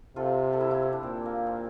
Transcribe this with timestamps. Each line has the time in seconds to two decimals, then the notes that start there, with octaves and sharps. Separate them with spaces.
0.16 C3 F4 A4
0.53 A4
0.60 E4 G4
0.71 E4 G4
0.82 C4
0.93 D4
1.03 A#2 C4
1.26 A#3
1.47 C4